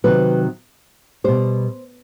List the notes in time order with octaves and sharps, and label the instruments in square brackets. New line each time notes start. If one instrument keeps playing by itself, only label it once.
[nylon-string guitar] C3 D#3 F#3 B4
B2 G3 C5